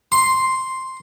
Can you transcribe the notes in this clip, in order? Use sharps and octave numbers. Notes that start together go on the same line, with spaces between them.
C6